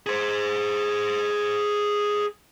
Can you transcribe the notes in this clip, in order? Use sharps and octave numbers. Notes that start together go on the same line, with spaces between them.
G#4 C5